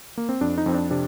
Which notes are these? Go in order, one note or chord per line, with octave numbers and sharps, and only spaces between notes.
A#3
C4
F2 D4
D#4
F2 C4
D4
C3 D4